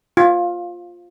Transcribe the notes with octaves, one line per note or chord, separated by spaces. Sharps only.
F4